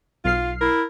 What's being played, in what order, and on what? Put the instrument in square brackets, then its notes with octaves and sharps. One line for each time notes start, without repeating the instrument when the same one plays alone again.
[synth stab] B1 F6 C7 [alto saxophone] F4
[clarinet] E4 [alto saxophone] A#4